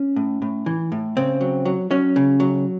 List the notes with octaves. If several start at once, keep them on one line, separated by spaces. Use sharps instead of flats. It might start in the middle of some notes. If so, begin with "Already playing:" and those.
Already playing: C#4
A2
A2
E3
A2
C#3 C4
F#3
F#3
F#3 C#4
C#3
F#3